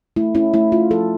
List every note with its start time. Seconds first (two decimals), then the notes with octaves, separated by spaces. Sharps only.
0.16 A3 E4
0.35 C#4 E4
0.54 A3 E4
0.72 A3 F4
0.91 F3 A4